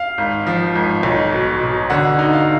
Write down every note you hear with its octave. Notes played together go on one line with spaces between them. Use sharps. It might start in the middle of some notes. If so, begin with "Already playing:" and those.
Already playing: F5
G#1
F3
G#1
B1
B2
B2
D3 F#5
D#4
F5